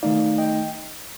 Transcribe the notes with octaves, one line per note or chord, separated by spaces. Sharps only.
D#3 A3 D#4 D5 F5
D#5 G5